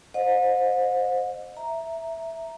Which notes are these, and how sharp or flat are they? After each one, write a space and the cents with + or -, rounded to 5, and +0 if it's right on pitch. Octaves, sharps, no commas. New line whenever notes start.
C5 +0 D#5 -20 F#5 -45
E5 +0 A#5 +0